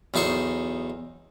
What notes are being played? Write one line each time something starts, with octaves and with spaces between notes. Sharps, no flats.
B1 E2 D#4 C5 C#6